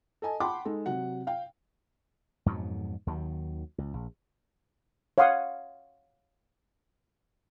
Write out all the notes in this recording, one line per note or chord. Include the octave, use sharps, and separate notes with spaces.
A4 D#5 G#5 A5
F#5 G5 A5 B5 C6 D6
G#3 D#4 A4
C3 F#3 F#5
F5 G5
F2 G#2 B2 F#3
D#2 D#3 F#3
C#2
A#1
C#5 F5 F#5 C6 D#6